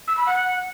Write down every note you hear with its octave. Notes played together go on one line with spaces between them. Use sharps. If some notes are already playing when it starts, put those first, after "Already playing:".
E6
B5
F#5